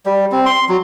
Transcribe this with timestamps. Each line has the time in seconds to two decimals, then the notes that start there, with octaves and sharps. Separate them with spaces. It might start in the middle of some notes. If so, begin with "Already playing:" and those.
0.06 G3
0.32 C4
0.46 C6
0.69 F#3